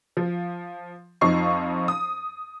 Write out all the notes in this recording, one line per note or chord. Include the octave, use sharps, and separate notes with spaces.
F3
F2 F3 D#4 C#6 C7
D#6